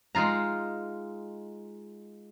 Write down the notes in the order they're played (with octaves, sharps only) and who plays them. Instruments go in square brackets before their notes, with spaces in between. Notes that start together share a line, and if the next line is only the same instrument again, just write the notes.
[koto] G#3 D#4 F4 A#5